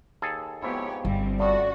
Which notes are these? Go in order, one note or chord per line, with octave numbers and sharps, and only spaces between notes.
D#2 G#4 A4
F2 G#2 B3 E4 G4 C#5
G1 G3 C4
A2 C#4 F4 F#4 D5